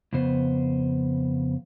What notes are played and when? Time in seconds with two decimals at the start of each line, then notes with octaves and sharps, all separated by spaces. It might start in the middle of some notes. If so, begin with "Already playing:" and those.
0.13 F2 C#3 B3 C5